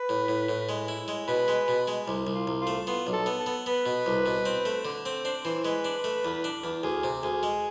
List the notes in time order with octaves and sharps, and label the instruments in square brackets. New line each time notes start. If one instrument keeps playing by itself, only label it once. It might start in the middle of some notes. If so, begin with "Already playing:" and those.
Already playing: [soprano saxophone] B4
[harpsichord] A2
A2
A2
G#3
E4
G#3
[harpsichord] B2 [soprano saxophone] B4
[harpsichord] G#3
B2
G#3
C2
C2
[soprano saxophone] F4
[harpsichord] C2
[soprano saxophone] F4
[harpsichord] A3
[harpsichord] B3 [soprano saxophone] F4
[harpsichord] B1
[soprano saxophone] A4
[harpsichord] B3
[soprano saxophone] A4
[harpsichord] B3
[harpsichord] B3 [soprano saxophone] B4
[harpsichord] B2
C2
B2
C4
A3
D3
C4
[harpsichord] D4 [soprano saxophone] C5
[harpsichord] E3 [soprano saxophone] C5
[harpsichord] G#3 [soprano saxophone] B4
[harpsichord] D4
A3
E2
D4
E2
[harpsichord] D2 [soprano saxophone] G#4
[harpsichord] C3
[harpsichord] D2 [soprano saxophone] G#4
[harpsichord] G#3